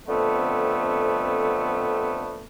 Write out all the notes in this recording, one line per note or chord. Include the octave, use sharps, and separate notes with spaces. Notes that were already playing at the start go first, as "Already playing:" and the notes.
F2 D3 A3 B3 C4